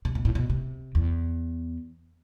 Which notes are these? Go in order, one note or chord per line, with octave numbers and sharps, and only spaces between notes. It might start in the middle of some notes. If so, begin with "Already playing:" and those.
C3
B2
A2
B2
C3
E2